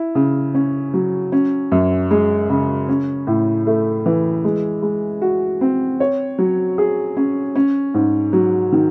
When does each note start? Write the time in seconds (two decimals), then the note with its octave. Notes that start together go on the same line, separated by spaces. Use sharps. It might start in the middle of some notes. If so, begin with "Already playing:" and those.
Already playing: E4
0.15 C#3
0.54 C#4
0.94 F#3
1.32 C#4
1.72 F#2
2.11 G#3
2.49 C#3
2.89 C#4
3.27 A2
3.67 A3
4.06 E3
4.44 G#3
4.82 G#3
5.22 F#4
5.61 C4
6.00 C#5
6.39 F#3
6.78 G#4
7.17 C#4
7.55 C#4
7.94 G#2
8.33 F#3
8.72 D#3